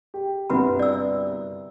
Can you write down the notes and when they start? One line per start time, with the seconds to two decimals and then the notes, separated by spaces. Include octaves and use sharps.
0.14 G4
0.50 G1 C2 F#4 B4 F#5 B5
0.79 D5 E6